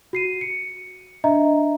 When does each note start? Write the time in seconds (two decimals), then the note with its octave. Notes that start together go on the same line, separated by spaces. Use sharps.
0.13 F#4 C7 D#7
0.41 C#7
1.24 D4 D#5 E5 A#5